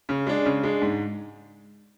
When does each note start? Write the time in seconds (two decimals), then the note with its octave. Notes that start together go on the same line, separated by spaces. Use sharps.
0.09 C#3
0.27 G#3 D4
0.45 C#3
0.63 G#3 D4
0.82 G#2